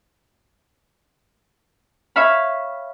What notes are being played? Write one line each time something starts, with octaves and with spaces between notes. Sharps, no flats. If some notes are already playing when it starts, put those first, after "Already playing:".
C#5 E5 F5 B5